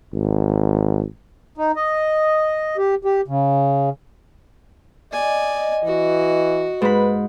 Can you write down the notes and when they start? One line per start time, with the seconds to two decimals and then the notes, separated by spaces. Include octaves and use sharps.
0.14 G#1
1.58 D#4
1.76 D#5
2.78 G4
3.05 G4
3.28 C#3
5.12 D5 D#5 G#5
5.84 E3 F#4
6.82 G#2 B4 B5